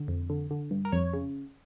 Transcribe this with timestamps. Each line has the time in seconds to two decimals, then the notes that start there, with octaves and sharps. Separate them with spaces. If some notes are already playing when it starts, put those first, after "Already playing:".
Already playing: D3
0.08 F2
0.30 D3
0.51 D3
0.71 G2
0.85 A#4
0.92 F2 C#5
1.13 C#3